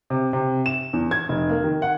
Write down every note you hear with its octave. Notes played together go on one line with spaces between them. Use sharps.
C3
C3
E7
E2
G#6
F1
A#3
D#3
F#5